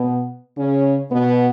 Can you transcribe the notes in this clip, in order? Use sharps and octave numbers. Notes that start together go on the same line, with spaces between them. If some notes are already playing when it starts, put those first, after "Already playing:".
Already playing: B2 B3
C#3 C#4
B2 B3